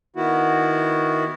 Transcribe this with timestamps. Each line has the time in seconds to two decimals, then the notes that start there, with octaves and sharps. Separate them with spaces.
0.16 D#3 B3 E4 F#4